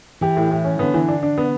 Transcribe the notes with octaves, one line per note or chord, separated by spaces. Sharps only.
E3 G4
A2
A2
C#4
D3 B3
E3
D4
D4
B3